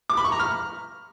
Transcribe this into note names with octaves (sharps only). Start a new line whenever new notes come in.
D6
B5
C#6
A#5
F6